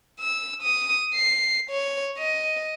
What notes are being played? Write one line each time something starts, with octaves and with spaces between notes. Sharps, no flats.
E6
D#6
C7
C#5
D#5